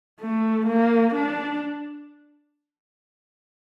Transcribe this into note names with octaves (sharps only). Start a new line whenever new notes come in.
A3
A#3
D4